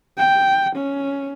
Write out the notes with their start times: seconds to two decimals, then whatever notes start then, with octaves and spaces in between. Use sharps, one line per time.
0.18 G5
0.76 C#4